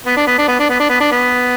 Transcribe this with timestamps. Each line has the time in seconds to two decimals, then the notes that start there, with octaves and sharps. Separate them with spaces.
0.06 B3
0.17 D4
0.27 B3
0.38 D4
0.48 B3
0.59 D4
0.69 B3
0.79 D4
0.90 B3
1.00 D4
1.12 B3